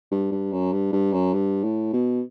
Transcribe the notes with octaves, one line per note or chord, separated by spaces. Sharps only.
G2
G2
F#2
G2
G2
F#2
G2
A2
B2